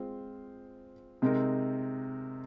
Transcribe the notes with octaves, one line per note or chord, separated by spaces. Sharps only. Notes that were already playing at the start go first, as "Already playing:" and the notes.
Already playing: G#3 C4 F4 C5
C3 G#3 C4 D#4 A#4